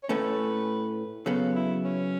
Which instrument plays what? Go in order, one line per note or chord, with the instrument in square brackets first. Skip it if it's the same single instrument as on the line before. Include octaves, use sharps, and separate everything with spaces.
[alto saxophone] C#5
[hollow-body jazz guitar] A2 A3 C#4 [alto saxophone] B4
[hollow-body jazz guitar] C#3 F#3 B3 [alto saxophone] A4
[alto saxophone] E4
C#4